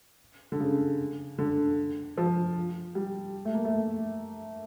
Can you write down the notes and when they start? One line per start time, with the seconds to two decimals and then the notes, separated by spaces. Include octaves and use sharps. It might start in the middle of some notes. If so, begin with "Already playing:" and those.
0.52 D3
0.60 C#3
1.38 D3
2.17 F3
2.95 G3
3.45 A3
3.55 A#3
3.65 A3